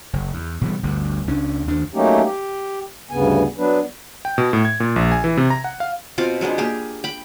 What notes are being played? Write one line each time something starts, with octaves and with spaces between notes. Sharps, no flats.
F#1
E2
B2 E3 G3
G1 D2 G2
C#2 C#4 D4
D#2 D#3 D4
F#3 A3 A#3 C#4 D#4 G4
G4
D2 G2 C#3 B3 G#5
F#3 B3 D4 B4
G5
B2
A2
G#6
A#2
A#1
G#5
E3
C3
A#5
F#5
F5
B2 C4 F4 D6
F#3 G#3 B3 D4
A#3 G4 G#4
G5 B5